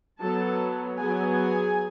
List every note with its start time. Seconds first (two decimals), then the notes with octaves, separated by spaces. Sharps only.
0.20 F#3 B3 A4 A5
0.99 F#3 B3 G#4 G#5